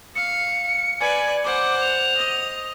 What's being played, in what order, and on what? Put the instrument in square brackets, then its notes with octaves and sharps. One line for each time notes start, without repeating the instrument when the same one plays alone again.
[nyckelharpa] F5 [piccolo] C#7
[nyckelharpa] B4 D5 [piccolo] G#5
[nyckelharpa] C5 F#5 [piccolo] D6
[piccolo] F7
[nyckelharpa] D#5